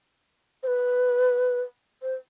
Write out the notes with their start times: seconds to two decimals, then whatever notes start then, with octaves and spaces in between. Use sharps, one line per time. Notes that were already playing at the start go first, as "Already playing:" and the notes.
0.63 C5
0.67 B4
2.02 C5